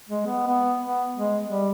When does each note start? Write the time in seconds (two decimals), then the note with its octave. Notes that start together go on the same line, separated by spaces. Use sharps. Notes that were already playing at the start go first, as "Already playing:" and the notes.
0.09 G#3
0.27 B3
0.47 B3
0.85 B3
1.16 G#3
1.50 G3